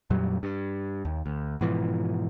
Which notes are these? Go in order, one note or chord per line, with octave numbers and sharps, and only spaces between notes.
F2 A#2 F#3 G3
G2
D#2
D2
G#2 B2 E3 F3